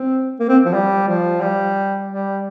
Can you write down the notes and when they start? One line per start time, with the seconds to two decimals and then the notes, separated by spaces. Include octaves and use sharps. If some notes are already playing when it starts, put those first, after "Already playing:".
Already playing: C4
0.40 A#3
0.49 C4
0.65 F3
0.73 G3
1.08 F3
1.41 G3
2.09 G3